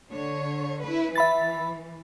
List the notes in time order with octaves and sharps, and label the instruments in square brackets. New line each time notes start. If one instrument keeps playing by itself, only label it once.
[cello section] D3 C#5
E4 B4
[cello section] E3 [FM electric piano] E5 B5 A6